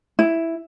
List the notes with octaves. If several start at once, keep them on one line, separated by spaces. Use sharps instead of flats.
E4